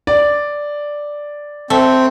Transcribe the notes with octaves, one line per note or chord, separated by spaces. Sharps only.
D5
A3 C4